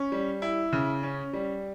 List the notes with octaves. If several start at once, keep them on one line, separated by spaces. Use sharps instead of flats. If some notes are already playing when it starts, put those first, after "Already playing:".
Already playing: C#4
G3
E4
C#3
C#4
G3